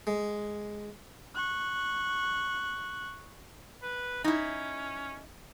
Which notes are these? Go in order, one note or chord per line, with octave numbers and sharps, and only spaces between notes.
G#3
C#6 F#6
B4
C#4 D#4 E4